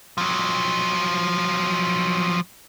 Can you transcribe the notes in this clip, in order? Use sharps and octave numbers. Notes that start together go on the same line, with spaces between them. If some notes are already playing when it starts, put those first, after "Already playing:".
F3 F#3